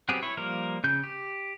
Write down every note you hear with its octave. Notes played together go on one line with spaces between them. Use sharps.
F#3 B3 C4 G4 G#4
E4 C#5
F3 G3 A#3 A#4
C#3 G6
G4